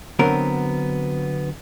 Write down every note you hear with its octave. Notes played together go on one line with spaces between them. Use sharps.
D3 F#3 B3 C4 A#4